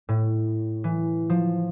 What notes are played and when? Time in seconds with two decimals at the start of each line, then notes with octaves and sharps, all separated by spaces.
0.09 A2
0.84 E3
1.30 F3